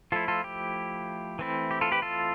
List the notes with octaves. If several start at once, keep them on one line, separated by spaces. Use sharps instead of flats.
F3 A3 E4 F4 A4
F4 A4
G4
E3 A3 C4 E4
G4
F4 A4
G4 B4
F4 A4